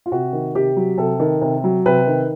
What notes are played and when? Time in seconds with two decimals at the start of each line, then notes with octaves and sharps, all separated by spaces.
0.06 F4
0.12 C3 F#4
0.33 D#3
0.55 C3 G4
0.77 F#3
0.98 C3 A4
1.20 D#3
1.42 C3
1.64 F#3
1.86 C3 B4
2.07 D#3